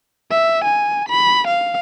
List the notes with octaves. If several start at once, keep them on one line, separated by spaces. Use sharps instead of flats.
E5
G#5
B5
F5